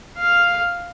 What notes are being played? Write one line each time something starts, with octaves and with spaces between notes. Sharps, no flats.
F5